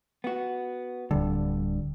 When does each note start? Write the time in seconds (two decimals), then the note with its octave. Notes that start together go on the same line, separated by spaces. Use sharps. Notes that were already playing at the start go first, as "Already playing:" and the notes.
0.24 B3 F#4
1.11 D1 G2 D3